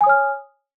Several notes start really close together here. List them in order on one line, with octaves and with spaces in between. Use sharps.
G#5 D#6 C#5 F6